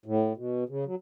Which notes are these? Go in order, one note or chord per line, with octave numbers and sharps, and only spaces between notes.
A2
B2
C#3
F#3